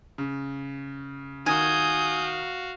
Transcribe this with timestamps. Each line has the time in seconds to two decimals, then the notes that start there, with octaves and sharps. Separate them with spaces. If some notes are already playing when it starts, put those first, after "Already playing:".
0.18 C#3
1.46 D#3 F#4 F5 G#5 D#6 G6